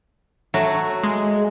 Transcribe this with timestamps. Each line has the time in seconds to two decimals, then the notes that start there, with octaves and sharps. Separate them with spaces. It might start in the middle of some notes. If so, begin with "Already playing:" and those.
0.54 F#3 A3 F#4
1.04 G#3